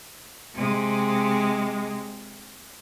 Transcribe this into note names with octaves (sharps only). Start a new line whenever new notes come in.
C3 G#3